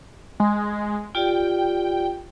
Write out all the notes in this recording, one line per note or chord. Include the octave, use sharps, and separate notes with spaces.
G#3
F4 G4 D5 G5